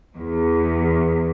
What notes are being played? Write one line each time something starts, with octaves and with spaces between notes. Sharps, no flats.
E2